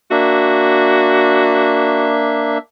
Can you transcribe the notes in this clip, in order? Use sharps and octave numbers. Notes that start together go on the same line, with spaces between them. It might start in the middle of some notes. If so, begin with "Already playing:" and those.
A#3 D4 F#4 E5